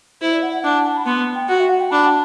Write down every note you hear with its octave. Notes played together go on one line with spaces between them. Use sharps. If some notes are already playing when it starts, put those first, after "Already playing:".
E4 C5
D5
F#5
F#5
D4 F#5
A5
B5
B3 C6
G5
F#4 F#5
E5
F#5
G5
D4 B5